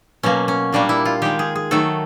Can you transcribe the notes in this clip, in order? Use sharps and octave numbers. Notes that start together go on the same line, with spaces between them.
B2 F#3 A#3 C#4
C#4
A#2 G3 A#3 D4
E4
F4
D#3 G#3 G4
G#4
G#4
D#3 F#3 A3 A4